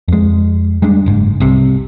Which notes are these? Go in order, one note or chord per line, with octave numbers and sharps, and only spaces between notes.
F2 G#3
G3 G#3 D4
F#1 G#2
C2 C3